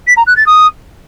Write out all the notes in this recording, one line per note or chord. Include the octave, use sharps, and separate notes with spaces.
B6
A#5
F#6
A6
D#6